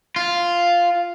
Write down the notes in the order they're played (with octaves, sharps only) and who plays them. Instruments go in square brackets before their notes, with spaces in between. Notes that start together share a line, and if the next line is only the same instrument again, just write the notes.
[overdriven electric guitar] F4